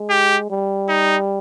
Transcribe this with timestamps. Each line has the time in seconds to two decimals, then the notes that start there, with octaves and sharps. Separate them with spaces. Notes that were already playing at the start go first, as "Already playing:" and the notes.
Already playing: G#3
0.10 G4
0.50 G3
0.89 D#4